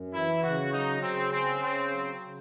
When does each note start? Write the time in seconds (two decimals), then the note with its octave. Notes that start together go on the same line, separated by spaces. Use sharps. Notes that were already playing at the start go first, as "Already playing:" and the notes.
Already playing: F#2
0.14 E3 E4
0.42 C#3 F#4
0.72 F#3 D#4
1.01 C#3 C4
1.31 C4 C#4
1.60 C#3 C4
1.90 F#3
2.20 C#3